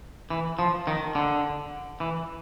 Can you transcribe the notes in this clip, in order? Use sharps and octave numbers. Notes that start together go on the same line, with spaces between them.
E3
F3
D#3
D3
E3